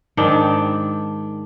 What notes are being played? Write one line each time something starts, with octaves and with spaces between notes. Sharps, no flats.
G#2 D#3 D4 G5